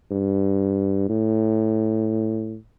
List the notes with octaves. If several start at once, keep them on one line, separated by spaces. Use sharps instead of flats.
G2
A2